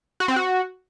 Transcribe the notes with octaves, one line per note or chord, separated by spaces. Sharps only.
F#4
C4
F#4